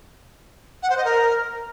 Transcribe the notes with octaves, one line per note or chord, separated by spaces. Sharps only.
F#5
C5
D#5
A#4